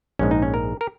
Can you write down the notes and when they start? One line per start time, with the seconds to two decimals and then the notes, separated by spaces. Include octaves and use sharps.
0.19 A#1 G#2 G#3 C#4
0.31 D#4
0.42 C#4
0.54 A#4
0.81 A#4